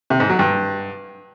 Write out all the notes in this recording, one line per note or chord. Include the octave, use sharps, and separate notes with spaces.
C3
G#2
F#3
G2